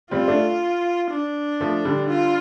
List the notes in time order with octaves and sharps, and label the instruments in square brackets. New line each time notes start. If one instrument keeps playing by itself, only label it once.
[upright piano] G3 C4 [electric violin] F4
[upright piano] A3 D4
[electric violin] D4
[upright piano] F3 A3
D3 G3
[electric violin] F4